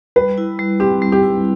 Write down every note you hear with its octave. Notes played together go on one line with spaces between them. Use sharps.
G3 B4
E4
G3
C4 G4
G3
G4
E4